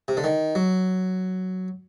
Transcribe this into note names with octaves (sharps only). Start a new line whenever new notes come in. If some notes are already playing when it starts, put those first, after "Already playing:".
C3
D3
D#3
F#3